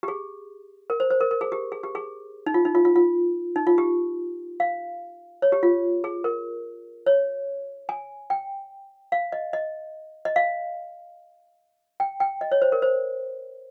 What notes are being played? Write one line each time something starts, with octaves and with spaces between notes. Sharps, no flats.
G4
G#4
A#4
C5
C5
A#4
A#4
G#4
G4
G#4
G4
G#4
D#4
F4
D#4
F4
F4
F4
D#4
F4
G4
F5
C#5
G4
F4
G#4
A#4
C#5
G#5
G5
F5
D#5
D#5
D#5
F5
G5
G5
D#5
C#5
C5
A#4
C5